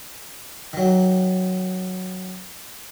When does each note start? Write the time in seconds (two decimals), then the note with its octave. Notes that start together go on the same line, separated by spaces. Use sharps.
0.73 D#3 F#3